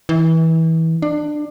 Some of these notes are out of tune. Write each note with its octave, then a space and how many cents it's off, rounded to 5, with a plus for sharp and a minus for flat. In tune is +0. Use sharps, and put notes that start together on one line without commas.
E3 -25
D4 +25